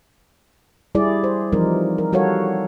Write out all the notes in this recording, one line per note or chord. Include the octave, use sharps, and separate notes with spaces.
G3 E4 G#4 D5
C5
E3 F3 G3 C4 D#4 A#4
A#4
G3 F#4 A4 A#4 C#5 F5